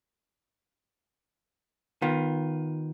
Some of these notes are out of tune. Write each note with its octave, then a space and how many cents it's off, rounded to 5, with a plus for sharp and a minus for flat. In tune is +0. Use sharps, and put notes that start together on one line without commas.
D#3 +0 B3 +0 F4 +25